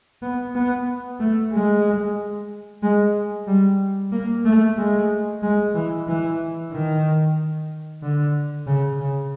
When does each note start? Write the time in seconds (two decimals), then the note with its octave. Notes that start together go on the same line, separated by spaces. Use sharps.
0.22 B3
0.55 B3
1.20 A3
1.53 G#3
2.83 G#3
3.47 G3
4.12 A#3
4.45 A3
4.77 G#3
5.43 G#3
5.74 E3
6.07 E3
6.72 D#3
8.02 D3
8.67 C#3
9.00 C#3